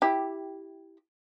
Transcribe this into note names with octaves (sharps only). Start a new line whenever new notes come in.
E4 G4